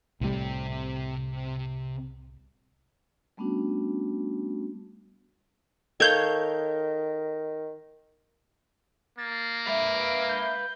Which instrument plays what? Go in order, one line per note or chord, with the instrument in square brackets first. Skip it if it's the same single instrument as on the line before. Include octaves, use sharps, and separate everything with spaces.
[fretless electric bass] C2 A2 G3 [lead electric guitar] C3 G4
[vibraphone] G3 A3 B3 C#4 D4 F#4
[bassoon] D#3 [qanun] A4 C#5 F5 [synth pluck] G6 G#6
[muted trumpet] A#3 [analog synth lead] A6
[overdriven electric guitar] B4 F5 [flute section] E5 [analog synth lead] D7
[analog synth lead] G6